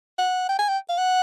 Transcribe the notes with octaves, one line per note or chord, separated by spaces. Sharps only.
F#5
G5
G#5
G5
F5
F#5